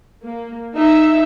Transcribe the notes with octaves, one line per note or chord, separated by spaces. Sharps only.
A#3
D#4 E5